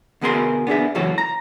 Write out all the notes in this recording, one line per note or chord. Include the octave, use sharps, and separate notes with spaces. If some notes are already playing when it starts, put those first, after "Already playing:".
D2 B2 B3 G#4 A#4 C6
B3 D4 G#4 E5
C#2 F#2 E3 F#4 A4 C#5
A#5